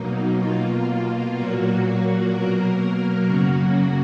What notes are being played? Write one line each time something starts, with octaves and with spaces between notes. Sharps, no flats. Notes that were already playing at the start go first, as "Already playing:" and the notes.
Already playing: B2 F#3 A#3 D#4
B2 A#3 F4
A#2 F#3 A#3 F#4
B2 F#3 A#3 A#4
F#2 C#3 F#3 A#3 F#4